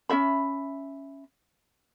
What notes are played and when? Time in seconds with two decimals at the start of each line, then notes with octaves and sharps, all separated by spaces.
0.09 C#4 F#4 E5 B5